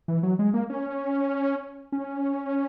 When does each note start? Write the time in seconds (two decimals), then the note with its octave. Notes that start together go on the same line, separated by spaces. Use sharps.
0.08 E3
0.23 F#3
0.39 G#3
0.54 A#3
0.70 C#4
1.92 C#4